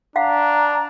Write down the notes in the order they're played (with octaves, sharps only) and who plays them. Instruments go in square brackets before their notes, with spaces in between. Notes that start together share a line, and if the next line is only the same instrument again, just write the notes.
[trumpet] D4 [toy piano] F5 F#5 [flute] A#5